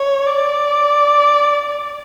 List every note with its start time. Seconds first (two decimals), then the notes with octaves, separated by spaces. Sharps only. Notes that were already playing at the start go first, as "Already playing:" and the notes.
Already playing: C#5
0.27 D5